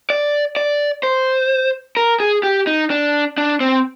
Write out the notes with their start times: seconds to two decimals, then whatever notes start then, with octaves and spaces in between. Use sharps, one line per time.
0.10 D5
0.56 D5
1.03 C5
1.97 A#4
2.20 G#4
2.43 G4
2.67 D#4
2.91 D4
3.38 D4
3.60 C4